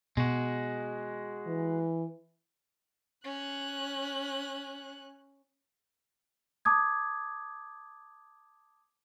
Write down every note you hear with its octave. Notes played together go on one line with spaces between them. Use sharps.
B2 G#3 F#4
E3
C#4 F#6
A5 D6 D#6 G#6